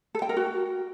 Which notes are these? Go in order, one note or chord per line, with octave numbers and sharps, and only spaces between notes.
A4
G5
A#4
F#4